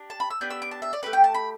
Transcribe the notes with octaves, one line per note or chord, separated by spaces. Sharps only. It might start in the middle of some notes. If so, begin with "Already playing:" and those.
Already playing: D4 G4
A5
B5
E6
B3 D4 G4 G6
E6
D6
A5
E5
D5
A3 G4 B4
G5
A5
B5